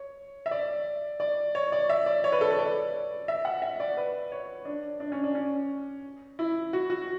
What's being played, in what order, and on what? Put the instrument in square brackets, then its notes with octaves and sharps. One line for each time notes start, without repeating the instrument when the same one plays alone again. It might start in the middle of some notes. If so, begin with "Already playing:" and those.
Already playing: [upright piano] C#5
E5
D5
D5
C#5
D5
E5
D5
C#5
B4
A4
B4
D5
E5
F#5
E5
D5
B4
C#5
D4
D4
C#4
D4
C#4
E4
F#4
F#4